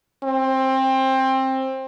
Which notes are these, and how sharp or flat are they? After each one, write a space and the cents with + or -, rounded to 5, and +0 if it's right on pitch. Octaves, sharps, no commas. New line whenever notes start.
C4 +20